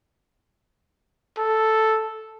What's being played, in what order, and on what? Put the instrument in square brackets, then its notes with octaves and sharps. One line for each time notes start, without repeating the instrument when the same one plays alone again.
[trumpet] A4